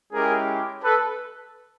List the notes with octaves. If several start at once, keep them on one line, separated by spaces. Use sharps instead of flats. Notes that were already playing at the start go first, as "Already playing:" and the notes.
G#3 C#4 E4 G4 G#4 A#4
A4 B4